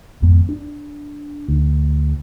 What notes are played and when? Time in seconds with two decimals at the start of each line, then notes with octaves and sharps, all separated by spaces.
0.22 G#1 F2 G#2 B3
0.49 D4
1.48 D2